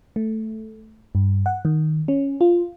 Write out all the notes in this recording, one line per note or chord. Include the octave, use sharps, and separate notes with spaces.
A3
G2
F#5
D#3
C#4
F4